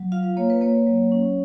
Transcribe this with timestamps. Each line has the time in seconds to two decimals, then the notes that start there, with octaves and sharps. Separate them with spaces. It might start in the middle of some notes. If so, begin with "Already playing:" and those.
Already playing: F#3
0.12 F4 F5
0.24 F5
0.37 A#3 C#5
0.50 B4
0.61 A#3 C#5
0.87 F#3
1.12 C#4